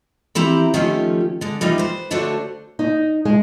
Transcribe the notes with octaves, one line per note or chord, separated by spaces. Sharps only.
E3 C4 E4 G4 A#5
D#3 F3 A3 C#4 F4 G4
D3 G#3
E3 G3 A#3 D#4 F4
B4 C5
D3 A3 D4 F#4 C5 C#5
D#4
G#3